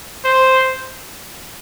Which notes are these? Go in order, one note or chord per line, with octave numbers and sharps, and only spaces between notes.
C5